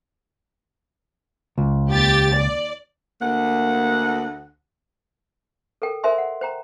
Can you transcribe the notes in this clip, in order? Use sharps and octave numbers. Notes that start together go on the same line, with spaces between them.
C#2
D#2 G4 A6
D5
D2 A#3 F#5
A4 A#4 G5
A#4 C5 E5 G#5 C6
F#5
C5 G5 A#5